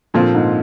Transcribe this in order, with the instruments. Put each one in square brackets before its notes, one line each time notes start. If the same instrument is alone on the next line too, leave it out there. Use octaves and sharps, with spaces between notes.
[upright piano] A#2 [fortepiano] D3 F3 C4 F4
[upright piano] G#2